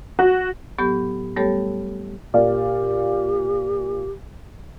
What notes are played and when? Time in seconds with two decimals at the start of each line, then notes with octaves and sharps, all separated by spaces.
0.19 F#4
0.78 A2 F#3 B3 G4 G6
1.36 G3 A3 B3 G4 A4 C#5
2.34 A#2 G4 D5 F5